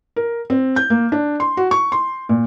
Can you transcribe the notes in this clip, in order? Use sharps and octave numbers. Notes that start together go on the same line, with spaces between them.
A#4
C4
G6
A#3
D4
C6
F#4
C#6
C6
A#2